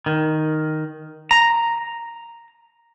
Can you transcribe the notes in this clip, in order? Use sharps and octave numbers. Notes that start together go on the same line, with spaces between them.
D#3
A#5